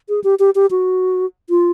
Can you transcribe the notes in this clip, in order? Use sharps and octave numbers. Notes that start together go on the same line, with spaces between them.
G#4
G4
G4
G4
F#4
F4